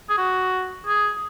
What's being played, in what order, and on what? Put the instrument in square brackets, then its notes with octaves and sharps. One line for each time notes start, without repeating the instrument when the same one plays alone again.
[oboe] G#4
F#4
G#4